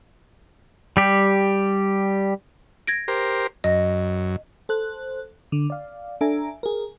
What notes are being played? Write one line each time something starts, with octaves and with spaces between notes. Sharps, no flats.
G3 G4
G#6 A#6 D7
G4 A#4 C5
F#2 D#5
A4 C5 F#6
D3
D5 F5
D4 A4 E5 G#5 A#5
G#4 A#4